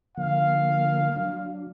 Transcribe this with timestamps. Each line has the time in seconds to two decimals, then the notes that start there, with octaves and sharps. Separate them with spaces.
0.17 D3 F3 A#3 F5
1.16 F#3 D4